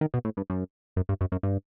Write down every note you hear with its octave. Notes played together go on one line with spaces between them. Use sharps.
D#3
B2
A2
G2
F#2
F#2
G2
F#2
F#2
G2